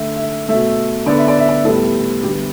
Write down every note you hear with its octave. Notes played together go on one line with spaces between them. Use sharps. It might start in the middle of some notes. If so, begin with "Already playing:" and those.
Already playing: D3 A3 E5
E5
B2 A3 E5
D3 B3 D5
E5
D5
E5
D5
A2 G3 B3 A4
D3 G3 B3 G4